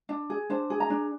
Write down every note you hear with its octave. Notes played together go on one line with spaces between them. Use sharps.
D4
G#4
D4 C5
G#4
A#5
D4